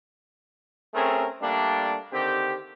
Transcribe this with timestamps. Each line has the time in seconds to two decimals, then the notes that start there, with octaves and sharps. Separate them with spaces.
0.94 A3 C4 C#4 G#4 A#4
1.41 G3 A3 A#3 D4
2.12 D3 D#3 C4 G4